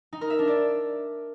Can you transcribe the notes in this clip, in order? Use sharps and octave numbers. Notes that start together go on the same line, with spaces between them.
D#4
A#4
E5
D4
D5